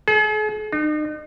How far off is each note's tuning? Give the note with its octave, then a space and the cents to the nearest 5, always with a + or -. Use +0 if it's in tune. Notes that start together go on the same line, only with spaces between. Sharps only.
G#4 +45
D#4 -40